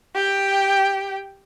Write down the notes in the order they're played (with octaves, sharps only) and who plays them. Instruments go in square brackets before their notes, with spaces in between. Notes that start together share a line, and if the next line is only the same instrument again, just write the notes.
[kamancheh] G4 G5